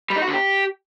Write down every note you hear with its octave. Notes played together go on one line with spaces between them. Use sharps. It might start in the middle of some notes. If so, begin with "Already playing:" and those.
G3
D#4
F#4
D3
G4